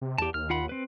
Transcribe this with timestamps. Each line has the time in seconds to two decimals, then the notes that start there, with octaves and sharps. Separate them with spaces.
0.01 C3
0.18 E2 G4 A5
0.34 D#2 F6
0.50 F4 F#5 B5
0.69 C4 B4